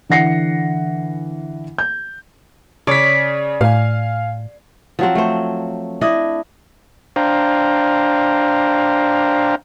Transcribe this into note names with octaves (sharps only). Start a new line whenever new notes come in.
D3 E3 F#5 A#6 C7 C#7
G6
C#3 C#5 D5 B6
A2 F5 G#5
F3 F#3 C4
A3 C5
D4 E4 D#5
D4 C5 F5 G5 A#5